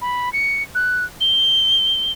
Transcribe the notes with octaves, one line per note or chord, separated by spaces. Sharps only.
B5
C#7
F#6
G7